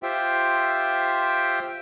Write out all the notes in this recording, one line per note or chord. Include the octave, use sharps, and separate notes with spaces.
F4 G4 C5 E5 G5